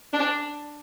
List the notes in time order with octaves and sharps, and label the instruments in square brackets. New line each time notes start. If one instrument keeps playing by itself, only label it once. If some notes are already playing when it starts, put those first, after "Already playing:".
[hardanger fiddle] D4